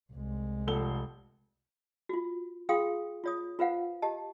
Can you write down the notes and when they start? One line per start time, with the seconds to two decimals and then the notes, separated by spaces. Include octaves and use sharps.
0.13 C2 G#3
0.67 F1 A4 G7
2.09 F4 F#4
2.69 F4 G#4 F5 G5 C6 D#6
3.24 F4 C#5 D#6
3.59 F4 B4 C5 F5 F#5
4.02 G4 D#5 A5